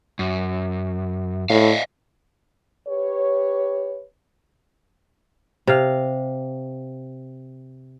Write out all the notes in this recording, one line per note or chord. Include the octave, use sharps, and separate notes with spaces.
F#2
A2 D5 D#5 F5
G4 B4 C#5
C3 F5